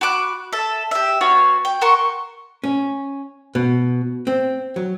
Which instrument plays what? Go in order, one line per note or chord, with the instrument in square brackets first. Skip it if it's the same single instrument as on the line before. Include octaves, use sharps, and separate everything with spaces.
[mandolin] F#4 B5 D6 F#6
A4 E5
G4 E5
B3 F#4 C#5 F5
G5
F#4 A#4 C6 C#6
[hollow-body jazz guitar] C#4
B2
C4
F#3